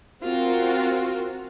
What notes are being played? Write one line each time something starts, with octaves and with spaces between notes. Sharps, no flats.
C4 F4 F#4 A#4